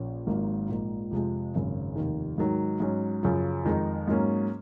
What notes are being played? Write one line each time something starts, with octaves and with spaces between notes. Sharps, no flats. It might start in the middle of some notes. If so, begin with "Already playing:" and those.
Already playing: A#1 A#2 C#4
G#1 G#2 F#3 A#3
A#1 G#2 F3 A#3 D#4
F2 C3 F3 G#3
G#1 F#2 C#3 G#3
F1 D#2 D#3
G#2 D#3 F#3
G#2 F#3 C#4
F#2 C#3 F3
F2 D#3 G#3 D#4
G#2 F#3 A#3 C#4